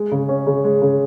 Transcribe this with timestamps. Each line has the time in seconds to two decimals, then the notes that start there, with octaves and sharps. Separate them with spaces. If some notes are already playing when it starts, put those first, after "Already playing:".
Already playing: G#3
0.12 C#3
0.29 C#4
0.47 C#3
0.64 G#3
0.82 C#3